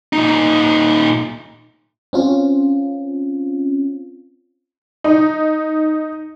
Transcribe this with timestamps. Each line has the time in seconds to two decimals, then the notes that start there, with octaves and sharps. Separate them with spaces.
0.13 A#2 D#4
2.13 C4 C#4 F4
5.04 D#4